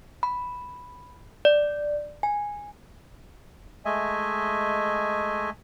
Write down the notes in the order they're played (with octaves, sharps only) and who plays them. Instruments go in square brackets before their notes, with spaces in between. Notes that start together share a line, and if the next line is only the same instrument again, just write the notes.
[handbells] B5
D5
G#5
[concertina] G#3 A3 D#5 E5 G#5